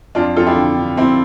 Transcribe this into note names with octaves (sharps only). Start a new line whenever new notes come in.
F2 D4 F4
F2 F4 A4
E4 G4
D3
D3
F2 C4 E4